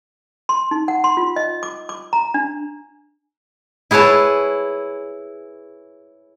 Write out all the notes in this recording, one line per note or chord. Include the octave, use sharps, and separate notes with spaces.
C6
D#4
F#5
C6
F4
D#5
D6
D6
A#5
D4
E4 G#4 B4 C#5 A5